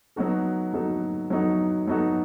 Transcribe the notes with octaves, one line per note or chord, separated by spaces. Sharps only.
F#3 B3 D#4 F#4 A4
F#3 B3 D#4 F#4 A4
F#3 B3 D#4 F#4 A4
F#3 B3 D#4 F#4 A4